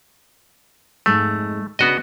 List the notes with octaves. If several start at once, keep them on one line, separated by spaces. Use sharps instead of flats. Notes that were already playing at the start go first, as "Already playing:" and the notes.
F2 G#2 G#3 A3
C#3 B3 D4 F#4 D#5